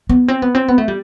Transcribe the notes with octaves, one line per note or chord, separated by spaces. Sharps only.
B3
C4
B3
C4
B3
A3
G3